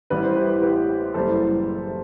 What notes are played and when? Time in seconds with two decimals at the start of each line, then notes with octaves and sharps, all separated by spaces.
0.10 A1 A2 G3 B4
0.23 C5
0.35 G4 B4
0.62 G4 B4
1.14 F#1 E3 G3 A4 C5